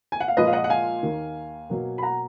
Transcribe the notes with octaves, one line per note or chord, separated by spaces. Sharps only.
G#5
F#5
F5
A#2 F3 G#3 B4 D#5
F5
D#5 F#5
F#5
F5 G#5
D#2 D#3 A#3
B2 F#3 A#3
B5
F#5 A#5